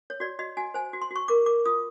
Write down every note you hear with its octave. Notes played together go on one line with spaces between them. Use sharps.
C#5
F#4 D5
F#4 D#5
F#4 G#5
C5 G#5
F#4
C6
F#4
C#6
A#4 D6
A#4 D6
F4 D#6